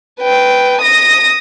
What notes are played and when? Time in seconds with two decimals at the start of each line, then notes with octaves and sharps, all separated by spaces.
0.21 B4 G5
0.82 D#6 A#6